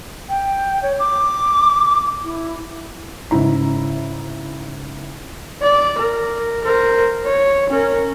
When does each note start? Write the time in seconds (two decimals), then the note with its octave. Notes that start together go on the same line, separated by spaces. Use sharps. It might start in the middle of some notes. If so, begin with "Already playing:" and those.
0.29 G5
0.82 C#5
0.99 D6
2.24 E4
3.31 G#2 C#3 E4 A#5
5.62 D5
5.99 A#4
6.64 A#4 C5
7.25 C#5
7.70 C#4 A#4